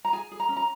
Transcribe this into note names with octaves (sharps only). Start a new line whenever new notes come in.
A#5
G#4 G#5
G#4
A#5
C#4
A#5